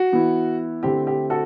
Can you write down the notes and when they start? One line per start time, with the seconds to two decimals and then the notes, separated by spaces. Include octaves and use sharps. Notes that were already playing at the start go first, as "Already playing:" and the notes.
Already playing: F#4
0.12 E3 B3 E4
0.83 D3 A3 C4 E4 G4
1.07 G4
1.30 F#4 A4